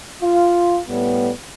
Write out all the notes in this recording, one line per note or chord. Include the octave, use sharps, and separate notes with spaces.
F4
A2 G3 B3